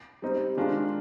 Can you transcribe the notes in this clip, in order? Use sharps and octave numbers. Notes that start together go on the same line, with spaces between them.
G3 C4 D#4
D#3 G#3 D4 F4